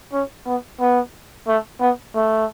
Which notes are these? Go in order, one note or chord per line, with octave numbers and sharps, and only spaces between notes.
C#4
B3
B3
A3
B3
A3